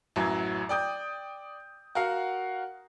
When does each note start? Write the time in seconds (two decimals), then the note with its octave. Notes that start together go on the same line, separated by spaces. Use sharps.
0.16 A1 F#2 E3 F#3
0.69 D5 G5 D#6 G6
1.95 F#4 A#4 F5 F#5